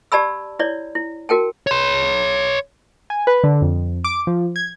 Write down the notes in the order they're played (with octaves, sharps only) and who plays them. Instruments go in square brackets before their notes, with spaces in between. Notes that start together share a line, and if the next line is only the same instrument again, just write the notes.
[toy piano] G4 D5 A5 B5 E6
E4 C#5 D5
E4
F#4 A#4 G5 A5
[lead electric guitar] C#5 C6
[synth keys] G#5
B4
D3
F2
D6
F3
G#6